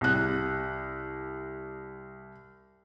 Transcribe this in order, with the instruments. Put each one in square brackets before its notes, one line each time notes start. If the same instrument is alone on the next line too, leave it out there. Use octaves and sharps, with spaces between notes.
[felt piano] C2 F#6